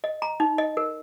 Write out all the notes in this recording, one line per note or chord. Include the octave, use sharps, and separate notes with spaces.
D#5
A#5
D#4
D#5
A#4